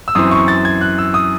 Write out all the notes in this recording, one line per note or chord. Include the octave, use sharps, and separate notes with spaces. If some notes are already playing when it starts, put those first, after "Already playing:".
E6
F#2 E3 C4 D#6
C#6
A6
G#6
F#6
E6
D#6